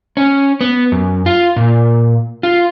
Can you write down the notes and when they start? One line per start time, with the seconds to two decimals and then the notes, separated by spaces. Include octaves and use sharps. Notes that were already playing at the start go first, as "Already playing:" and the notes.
0.17 C#4
0.61 B3
0.92 F#2
1.26 F4
1.56 A#2
2.43 F4